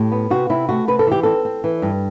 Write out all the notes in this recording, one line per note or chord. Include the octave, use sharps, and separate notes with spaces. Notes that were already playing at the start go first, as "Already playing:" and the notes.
Already playing: A2 G4
B3
C3 F#4
C3 E4
A3 F#4
C3 B4
A4
E3 G4
C4 A4
C4
E3
G2